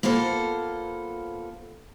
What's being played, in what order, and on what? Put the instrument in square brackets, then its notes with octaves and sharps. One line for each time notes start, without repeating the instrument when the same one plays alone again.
[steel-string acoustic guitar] A#3 B3 F4 A4 C5